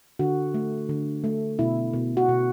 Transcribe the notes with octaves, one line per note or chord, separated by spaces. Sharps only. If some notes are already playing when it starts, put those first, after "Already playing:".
D3 F#4
A3
D3
A3
B2 E4
B2
F#4
B2